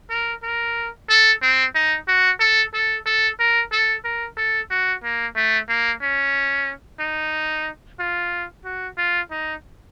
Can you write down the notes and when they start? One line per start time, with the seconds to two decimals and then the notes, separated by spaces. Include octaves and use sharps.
0.10 A#4
0.43 A#4
1.10 A4
1.42 C4
1.75 D#4
2.08 F#4
2.40 A4
2.74 A4
3.06 A4
3.40 A#4
3.72 A4
4.05 A#4
4.37 A4
4.71 F#4
5.04 A#3
5.36 A3
5.69 A#3
6.02 C#4
7.00 D#4
8.00 F4
8.65 F#4
8.98 F4
9.31 D#4